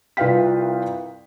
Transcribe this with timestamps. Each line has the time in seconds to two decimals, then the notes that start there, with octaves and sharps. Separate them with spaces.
0.17 C2 F4 B4 F5 G5 B6